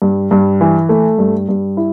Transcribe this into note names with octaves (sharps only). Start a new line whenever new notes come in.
G2
G2
E3
A3
G2
G2
E4